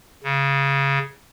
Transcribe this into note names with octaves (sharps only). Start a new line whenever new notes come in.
C#3